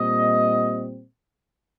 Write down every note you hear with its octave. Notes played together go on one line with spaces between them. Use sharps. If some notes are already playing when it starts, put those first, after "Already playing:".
Already playing: A#2 G3 C4 D#5